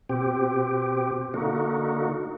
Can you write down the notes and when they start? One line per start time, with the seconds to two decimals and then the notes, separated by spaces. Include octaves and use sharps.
0.09 B2 C4 G4
1.34 D3 A#3 D#4 F#4